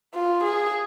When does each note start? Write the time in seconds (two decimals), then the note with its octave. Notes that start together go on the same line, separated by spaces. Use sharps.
0.14 F4
0.44 G#4